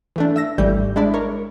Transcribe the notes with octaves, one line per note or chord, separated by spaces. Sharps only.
E3 A3 D4
E5 E6 A#6
G#1 E3 G3 A3 G6
G#3 D4 E4 D5
A#4 C#5